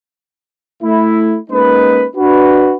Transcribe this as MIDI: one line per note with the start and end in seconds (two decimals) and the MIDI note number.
0.83 1.38 57
0.83 1.38 64
1.51 2.06 56
1.51 2.06 58
1.51 2.06 61
1.51 2.06 63
1.51 2.06 71
2.16 2.76 62
2.16 2.76 66
2.16 2.76 71